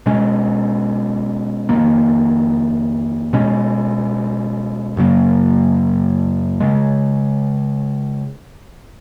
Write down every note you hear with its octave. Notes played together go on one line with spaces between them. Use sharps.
B2 G#3 C#4
F2 D#3 A#3
B2 G#3 C#4
F#2 C#3 F#3 A#3
C#3 G#3